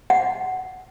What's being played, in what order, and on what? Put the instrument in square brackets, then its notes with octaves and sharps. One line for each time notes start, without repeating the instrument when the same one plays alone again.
[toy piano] F#5